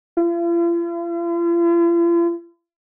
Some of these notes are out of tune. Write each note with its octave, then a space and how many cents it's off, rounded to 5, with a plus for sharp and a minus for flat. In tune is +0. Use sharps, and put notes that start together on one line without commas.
F4 -45